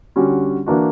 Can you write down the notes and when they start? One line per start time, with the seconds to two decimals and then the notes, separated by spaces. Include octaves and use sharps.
0.16 D3 G3 C#4 F#4
0.66 E3 A#3 D4 F#4